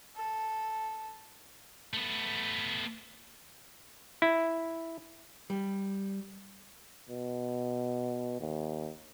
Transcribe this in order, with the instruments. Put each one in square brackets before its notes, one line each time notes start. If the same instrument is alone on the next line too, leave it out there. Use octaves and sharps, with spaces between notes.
[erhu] A4
[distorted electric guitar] A3 B3
[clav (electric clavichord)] E4
[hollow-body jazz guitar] G3
[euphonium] B2
D#2